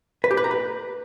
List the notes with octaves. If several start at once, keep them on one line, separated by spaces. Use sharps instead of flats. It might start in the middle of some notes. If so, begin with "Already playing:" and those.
B4
G4
B4
A#5
B4